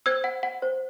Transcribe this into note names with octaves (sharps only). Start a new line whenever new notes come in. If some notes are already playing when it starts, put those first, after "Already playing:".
C5 E6 G#6
F#5
F#5
C5